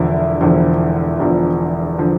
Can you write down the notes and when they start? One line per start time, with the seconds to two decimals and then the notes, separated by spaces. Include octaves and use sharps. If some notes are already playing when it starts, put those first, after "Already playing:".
Already playing: E1 E2 D3 F3 E4
0.41 E1 E2 D3 F3
1.19 E1 E2 D3 F3
1.98 D3 F3